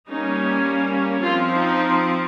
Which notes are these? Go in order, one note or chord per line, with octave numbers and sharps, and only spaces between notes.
G3 A#3 C#4 D#4
F3 C4 F4
D#4